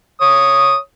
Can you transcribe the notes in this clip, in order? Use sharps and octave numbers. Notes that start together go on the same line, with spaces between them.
C#5 D#6